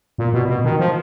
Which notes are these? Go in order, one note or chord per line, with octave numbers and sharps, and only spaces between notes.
A#2
B2
B2
D#3
F3